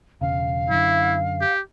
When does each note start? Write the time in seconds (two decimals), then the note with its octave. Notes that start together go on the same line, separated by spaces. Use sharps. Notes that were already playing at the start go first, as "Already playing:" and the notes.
0.21 E1 C#3 F5
0.70 F#2 D3 E4
1.41 G4